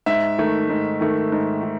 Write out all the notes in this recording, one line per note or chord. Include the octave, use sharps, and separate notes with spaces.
G#2 E5
D#3 A3
G#2
D#3 A3
G#2
D#3